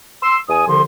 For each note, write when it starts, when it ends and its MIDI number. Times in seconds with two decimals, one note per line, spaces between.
0.21 0.37 84
0.21 0.37 88
0.48 0.65 40
0.48 0.65 80
0.48 0.65 87
0.67 0.81 36
0.67 0.81 50
0.67 0.81 53
0.67 0.81 84